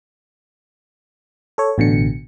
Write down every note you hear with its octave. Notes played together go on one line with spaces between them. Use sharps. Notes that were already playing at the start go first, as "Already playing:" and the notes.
A4 C#5
A1 B2 D3 C#7